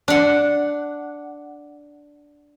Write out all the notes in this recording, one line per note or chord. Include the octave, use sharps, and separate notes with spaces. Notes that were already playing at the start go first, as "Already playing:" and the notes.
D4 F#5